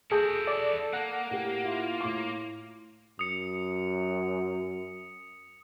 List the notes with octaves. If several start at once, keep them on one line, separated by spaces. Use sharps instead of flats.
E4 F#4 G#4 A4 A5 D#6 G6
D5
A#3 F#5
A2 G4
E4 F4
A2 C6 D6
F#2 D#6 C#7